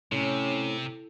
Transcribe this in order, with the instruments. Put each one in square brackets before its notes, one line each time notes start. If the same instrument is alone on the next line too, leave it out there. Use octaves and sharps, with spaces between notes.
[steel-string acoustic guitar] A2 [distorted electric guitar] C3 [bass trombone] C#4